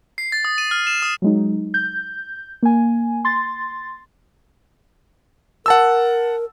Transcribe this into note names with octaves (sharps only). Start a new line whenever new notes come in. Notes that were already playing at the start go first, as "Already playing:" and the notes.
C7
A6
D#6
D#7
F6
E7
D#6
F#3 G#3 D#4
G6
A#3 G#5
C6 A6
A#4 F#5 A5 E6